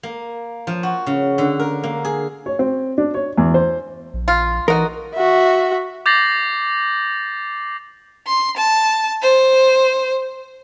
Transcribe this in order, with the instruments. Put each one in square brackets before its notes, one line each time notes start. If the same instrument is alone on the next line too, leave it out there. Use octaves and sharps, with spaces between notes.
[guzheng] A#3
F3
F#4
C#3
D3
A#4
A#3
G#4
[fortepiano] C#5
C4
D4
C#5
E2
C5
[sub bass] A#1
[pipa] F4
[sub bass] E3 [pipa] D#4 F#4 [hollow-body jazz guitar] A#4 D#5
[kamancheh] F#4 E5
[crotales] D6 G6 A6 A#6 C7 F#7
[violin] C6
A5
C5